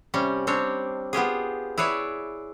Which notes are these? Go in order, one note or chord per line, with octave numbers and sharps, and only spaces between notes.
C3 G3 C#4
G3 C4 D4 C#5
B3 F4 G4 G#4
E4 G#4 B4 C#5 D5